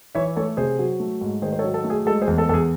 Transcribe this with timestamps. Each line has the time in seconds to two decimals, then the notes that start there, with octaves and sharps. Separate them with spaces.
0.15 E3 C#5 E5
0.36 A3 A4 C#5
0.57 C3 G#4 C5
0.79 F#3
1.00 A3
1.21 G#2
1.42 D#3 G#4 C5
1.53 C5
1.59 A4 C#5
1.64 F#3
1.74 A4
1.84 A3
1.90 G#4
2.06 G#3 A4
2.22 G#4 C5
2.27 E2
2.38 A4
2.49 E2 A4
2.54 G#4